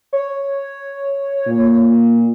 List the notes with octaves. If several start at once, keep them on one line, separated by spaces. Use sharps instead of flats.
C#5
A#2